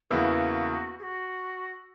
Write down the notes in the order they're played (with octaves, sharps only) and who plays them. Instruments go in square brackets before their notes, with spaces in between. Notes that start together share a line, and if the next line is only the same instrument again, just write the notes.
[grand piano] E2 C#3 E3 A#3 E4 [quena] F#4
[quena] G#4
F#4